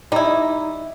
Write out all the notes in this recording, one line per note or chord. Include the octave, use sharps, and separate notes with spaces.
G3 D#4 E4